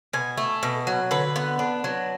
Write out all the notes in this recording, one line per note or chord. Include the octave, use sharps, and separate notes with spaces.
B2 G#5
A3
B2
F#3
D3 B4
B3
D4
F#3